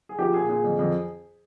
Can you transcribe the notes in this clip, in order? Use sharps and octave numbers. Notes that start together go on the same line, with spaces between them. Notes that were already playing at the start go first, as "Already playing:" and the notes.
G#4
F3 G4
A#2 G#4
A#2 G#4
F2
F2